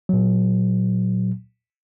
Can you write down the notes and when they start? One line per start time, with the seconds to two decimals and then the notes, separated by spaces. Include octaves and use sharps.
0.09 A#2 F#3